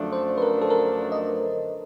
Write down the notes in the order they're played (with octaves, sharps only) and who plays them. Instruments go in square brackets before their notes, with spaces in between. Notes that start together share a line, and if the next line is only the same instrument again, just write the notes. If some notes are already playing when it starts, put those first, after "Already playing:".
Already playing: [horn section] F#2 D3 F3 A3 D4
[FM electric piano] C5
B4
A#4
A4
A#4
D#5